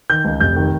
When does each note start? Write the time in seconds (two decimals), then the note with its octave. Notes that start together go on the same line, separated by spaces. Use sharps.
0.10 D#3 G6
0.25 C#2
0.40 F1 G6
0.56 D#3